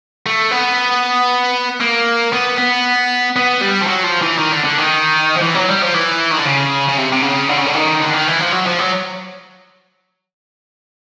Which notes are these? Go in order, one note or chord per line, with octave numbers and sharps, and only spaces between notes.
A3
B3
A#3
B3
B3
B3
G3
F3
F#3
F3
E3
D#3
D3
D3
D#3
F3
E3
F#3
G3
F3
E3
D#3
D3
C#3
C#3
C3
C3
C#3
D3
C#3
D3
D#3
D3
D#3
E3
F3
F#3
F3
F#3